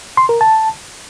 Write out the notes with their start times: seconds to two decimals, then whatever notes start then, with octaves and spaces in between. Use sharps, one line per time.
0.17 C6
0.29 A#4
0.41 A5